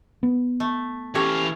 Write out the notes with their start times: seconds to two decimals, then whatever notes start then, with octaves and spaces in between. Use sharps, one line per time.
0.23 B3
0.60 A3
1.15 E3 C#4 G4 A4 C#5 F5